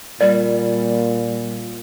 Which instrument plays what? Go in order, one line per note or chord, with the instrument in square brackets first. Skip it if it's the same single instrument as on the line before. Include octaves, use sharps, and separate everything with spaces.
[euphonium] A#2 [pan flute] G3 [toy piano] D5